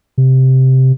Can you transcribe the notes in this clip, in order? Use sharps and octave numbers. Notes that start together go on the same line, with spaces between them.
C3